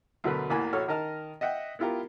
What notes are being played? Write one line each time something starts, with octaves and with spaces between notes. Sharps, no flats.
D2 B2 F#3 A3 A#4 B4
A1 E2 E3 A#3 G#5 B5
A#1 F#4 A4 C#5 F6
D#3 A#4 D#5 A5 F6
D#5 E5 F#5 G5
B3 E4 F4 G4 A#4